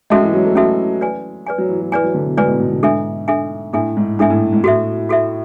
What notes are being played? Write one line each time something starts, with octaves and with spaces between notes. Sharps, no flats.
G#3 C#4 F#4 A4 E5 A5
E3
F#3
A3
C#4 F#4 A4 E5 A5
B4 D5 G#5
B4 D5 G#5
F#3
E3
F#3
E3 B4 D5 G#5
F#3
D3
B2
G#2 B4 D5 G#5
B2
A2
B2
D3
G#2 D4 A4 E5 G#5
D4 A4 E5 G#5
A2 D4 A4 E5 G#5
G#2
G#2 D4 A4 E5 G#5
A2
G#2
A2 F#4 A4 E5
F#4 A4 E5